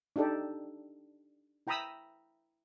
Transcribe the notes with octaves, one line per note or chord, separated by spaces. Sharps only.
D4 D#4 G4 A4 D5
E4 G5 A#5 B5 D#6 E6